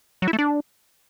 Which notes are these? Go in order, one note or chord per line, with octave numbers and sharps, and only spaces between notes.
F#3
E4
A3
D4